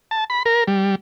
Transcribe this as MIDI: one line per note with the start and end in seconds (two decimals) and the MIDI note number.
0.11 0.24 81
0.30 0.43 83
0.46 0.64 70
0.68 0.95 55